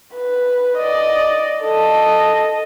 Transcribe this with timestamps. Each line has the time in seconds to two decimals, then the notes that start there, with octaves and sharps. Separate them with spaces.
0.15 B4
0.77 D5 D#5
1.63 A4 D#5